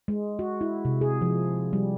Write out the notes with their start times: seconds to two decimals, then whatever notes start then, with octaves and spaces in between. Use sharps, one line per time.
0.08 G#3
0.39 F#4
0.61 E4
0.85 C3
1.01 G#4
1.21 F3
1.73 G3